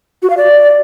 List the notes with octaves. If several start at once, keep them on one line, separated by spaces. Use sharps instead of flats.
F#4
F5
D5